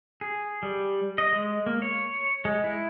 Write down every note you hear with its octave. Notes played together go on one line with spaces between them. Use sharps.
G#4
G3
D#5
G#3
A#3
C#5
G#3
E4